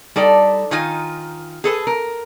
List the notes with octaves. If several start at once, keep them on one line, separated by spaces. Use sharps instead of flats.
G3 D#4 A4 D5
D#3 D#4 F4 G#5
G#4 A4 B4
A#4